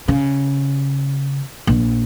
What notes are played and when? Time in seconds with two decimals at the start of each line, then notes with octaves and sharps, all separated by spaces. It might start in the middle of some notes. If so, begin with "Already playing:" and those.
0.08 C#3
1.67 A#1